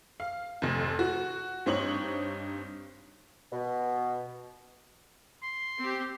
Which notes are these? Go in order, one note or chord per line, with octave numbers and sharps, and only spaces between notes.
F5
F1 F2
F#4
G2 C4 D#4 C#5 C#6 F#7
B2
C6
C4 G4